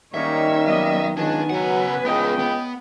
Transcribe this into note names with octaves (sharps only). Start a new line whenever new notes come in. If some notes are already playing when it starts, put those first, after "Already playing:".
D#3 G3 A#3 C#4 D#4 C#5 E5
F#3 B3 D#5
C#2 D#3 B3 D4 G#5
C#3 F#3 B4 F#5
C#2 B3 G#4 D#5 G5
B3